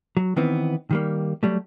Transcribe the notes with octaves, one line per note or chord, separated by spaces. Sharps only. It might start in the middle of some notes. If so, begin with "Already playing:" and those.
F#3
D#3 E3 B3 C4
D#3 G3 A#3
F#3 G3 A3